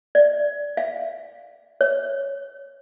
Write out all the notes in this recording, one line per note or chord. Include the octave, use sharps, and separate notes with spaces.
D5
F5
C#5